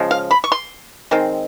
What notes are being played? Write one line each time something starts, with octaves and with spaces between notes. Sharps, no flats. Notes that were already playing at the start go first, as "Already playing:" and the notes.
Already playing: C#3 F3 G#3
F5
B5
C#6
C6
D#3 G#3 C4